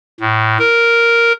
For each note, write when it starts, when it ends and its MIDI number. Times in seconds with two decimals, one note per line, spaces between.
0.20 0.58 45
0.59 1.32 70